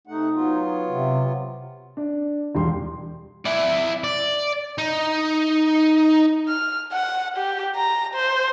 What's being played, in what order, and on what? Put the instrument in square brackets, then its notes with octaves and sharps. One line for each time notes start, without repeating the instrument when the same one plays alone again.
[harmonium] C3 A3 F#5 [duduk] D#4
[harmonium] F#3 B3 F4
[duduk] C3
[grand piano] D4
E1 G3 C6
[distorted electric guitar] E4 D5
D5
D#4
[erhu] F6
F#5
G4
A#5
C5